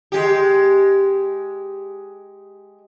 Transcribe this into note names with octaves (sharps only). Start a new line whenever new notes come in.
G#3 G4